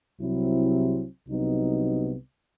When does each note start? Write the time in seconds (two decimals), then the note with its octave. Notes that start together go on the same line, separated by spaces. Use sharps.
0.18 C2 C3 F#3 C4 E4
1.27 C2 C3 F#3 B3 D#4